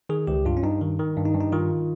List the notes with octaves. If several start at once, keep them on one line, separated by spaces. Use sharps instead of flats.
D#3 G#4
C#2 G4
G2 F4
C#4
G2 D#4
D#3
D#3
G2
D#4
G2
D#4
D#3 F4